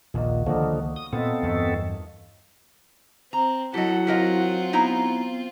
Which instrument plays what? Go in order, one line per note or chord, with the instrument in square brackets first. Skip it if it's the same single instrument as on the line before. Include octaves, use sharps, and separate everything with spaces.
[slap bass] A#1 D#2 [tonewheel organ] A#2 [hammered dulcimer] G#3 A#3 F#4
[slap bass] C#2 D#3 A#3 [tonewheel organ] D3 F3 [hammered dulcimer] B3 D#4 F#4
[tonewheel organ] D#6
[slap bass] A#2 [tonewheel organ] B3 C4 A4 [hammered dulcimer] D#4 F4 A5
[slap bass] E2 G2 G3 [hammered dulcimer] C3 D#3 C#5
[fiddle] C4 [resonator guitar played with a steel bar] A#5
[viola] F#3 F#5 [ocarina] E4 [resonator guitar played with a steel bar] G4 D#5 [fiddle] A4
[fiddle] C4 F4 [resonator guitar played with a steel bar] G4 A#4 D#5
[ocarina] B3 [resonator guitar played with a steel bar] D#4 E4 A#5